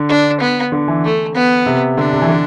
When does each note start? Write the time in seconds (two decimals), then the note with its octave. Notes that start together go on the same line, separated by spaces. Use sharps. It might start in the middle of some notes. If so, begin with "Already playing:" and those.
Already playing: D3
0.09 D4
0.40 B3
0.72 D3
0.88 E3
1.04 A3
1.34 B3
1.66 C3
1.97 D3 D4
2.13 C3
2.22 E3
2.28 D3